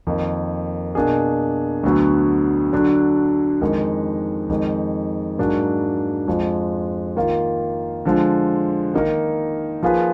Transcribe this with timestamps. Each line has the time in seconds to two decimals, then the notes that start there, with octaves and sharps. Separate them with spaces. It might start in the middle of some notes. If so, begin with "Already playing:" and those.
0.07 F2 D#3 A#3
0.95 B2 A#3 D4 G#4
1.83 D2 D3 F#3 B3
2.73 D3 F#3 D4
3.61 F2 D#3 G#3 D#4 A#4
4.49 F2 D#3 G#3 D#4
5.38 G#2 F#3 A#3 D4 G#4
6.28 F2 F3 G#3
7.16 D#3 A#3 F4
8.05 D3 F3 G#3
8.94 D#3 A#3 D#4 A#4
9.83 F3 A#3 F4 G#4 B4